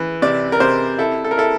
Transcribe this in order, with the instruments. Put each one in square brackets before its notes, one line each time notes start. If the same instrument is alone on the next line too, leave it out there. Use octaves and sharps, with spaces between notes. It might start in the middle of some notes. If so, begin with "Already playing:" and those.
Already playing: [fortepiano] E3
C3 D5
A#4
C3 C5
E4 A4
A4
A#4
E4 A4